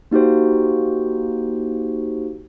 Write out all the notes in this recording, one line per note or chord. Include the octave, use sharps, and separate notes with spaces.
A#3 D#4 F#4 G4 C5